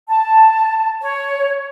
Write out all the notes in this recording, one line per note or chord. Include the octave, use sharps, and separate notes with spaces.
A5
C#5